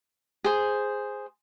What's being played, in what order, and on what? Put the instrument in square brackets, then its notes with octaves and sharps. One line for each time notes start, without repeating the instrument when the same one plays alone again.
[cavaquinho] G#4 C5